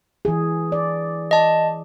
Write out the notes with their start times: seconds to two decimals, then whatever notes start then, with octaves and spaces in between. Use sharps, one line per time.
0.25 E3 G#4
0.72 D5
1.31 D#5 A5